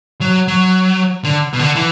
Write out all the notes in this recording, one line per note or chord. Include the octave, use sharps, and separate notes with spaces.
F#3
F#3
D3
B2
D3
E3